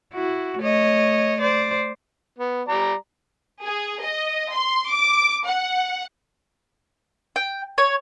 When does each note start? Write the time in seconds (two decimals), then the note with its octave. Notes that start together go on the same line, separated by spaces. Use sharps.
0.14 E4 F#4
0.59 A3 C#5 D#5
1.41 C5 D5
2.38 B3
2.68 G3 D5 A#5
3.64 G#4
4.02 D#5
4.53 C6
4.91 D6
5.47 F#5
7.36 G5
7.78 C#5